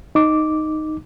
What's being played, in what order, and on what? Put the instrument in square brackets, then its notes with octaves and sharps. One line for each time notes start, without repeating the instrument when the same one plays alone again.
[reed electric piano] D#4 D6